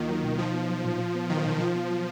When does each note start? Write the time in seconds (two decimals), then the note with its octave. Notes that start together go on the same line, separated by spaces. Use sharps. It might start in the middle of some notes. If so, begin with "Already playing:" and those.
Already playing: D2 D#3 A#3 F4
0.09 F#3
0.24 B2
0.38 F3 D#4
0.54 B3
0.69 F#3
0.84 A#2
0.99 F4
1.15 B3
1.29 D#3 F#3
1.45 B2
1.60 F3 F4
1.75 B3
1.91 F#3